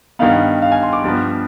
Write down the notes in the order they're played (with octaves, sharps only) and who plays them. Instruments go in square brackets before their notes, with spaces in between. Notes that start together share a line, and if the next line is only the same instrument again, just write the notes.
[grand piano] G2 D#3 B3 F5
F5
G#5
C6
D6
G2 F3 B3